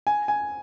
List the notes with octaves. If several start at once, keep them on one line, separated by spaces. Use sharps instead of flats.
G#5
G#5